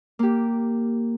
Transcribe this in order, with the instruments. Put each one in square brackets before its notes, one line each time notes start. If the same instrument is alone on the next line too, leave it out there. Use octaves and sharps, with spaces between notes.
[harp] A#3 G4